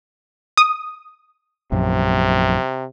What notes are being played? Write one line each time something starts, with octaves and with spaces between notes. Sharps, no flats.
D#6
A#1 F#2 C3